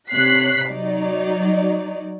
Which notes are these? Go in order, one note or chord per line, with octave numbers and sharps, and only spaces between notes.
C3 C#5 F#6 B6 C7
F#3 D#4 D5